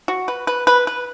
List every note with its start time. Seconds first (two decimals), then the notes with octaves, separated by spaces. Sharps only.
0.08 F#4
0.28 B4
0.47 B4
0.67 B4
0.87 B4